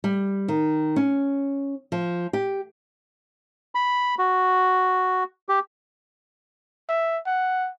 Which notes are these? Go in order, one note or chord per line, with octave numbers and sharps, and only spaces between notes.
G3
D#3
C#4
F3
G4
B5
F#4
G4
E5
F#5